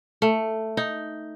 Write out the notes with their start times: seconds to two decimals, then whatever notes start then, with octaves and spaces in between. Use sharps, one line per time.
0.22 A3
0.77 D#4